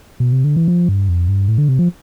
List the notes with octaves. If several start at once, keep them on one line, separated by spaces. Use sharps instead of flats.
B2
C3
D3
E3
F3
G2
F2
G2
A2
D3
C3
F3